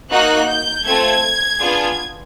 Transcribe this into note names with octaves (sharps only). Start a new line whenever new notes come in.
A#3 D#4 F#4 F#6
G6
A3 C4 F4 A4 G#6
B3 D4 F4 G#4